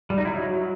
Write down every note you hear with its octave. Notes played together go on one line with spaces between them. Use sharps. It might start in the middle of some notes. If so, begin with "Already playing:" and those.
G3
D#4
E4
F#3